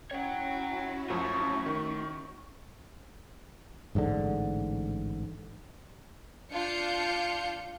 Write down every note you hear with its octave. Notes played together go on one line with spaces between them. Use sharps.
C#4 E4 F#4 C#5 F#5 G5
F#2 F3 F#3 A3 C#6
D#3
A1 G#2 B2 D3
D4 F4 F5 G6 C#7